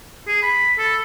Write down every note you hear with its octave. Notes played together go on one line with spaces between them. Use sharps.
G#4
B5
A4